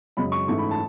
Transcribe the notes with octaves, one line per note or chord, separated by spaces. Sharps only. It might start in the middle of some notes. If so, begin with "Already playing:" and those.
F#2 C#3 G#3 B5
C#6
G#2 E3 A3 C#4 C#6
B5
A5